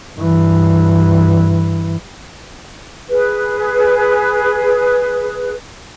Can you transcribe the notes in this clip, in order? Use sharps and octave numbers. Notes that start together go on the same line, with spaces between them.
G2 E3
G#4 B4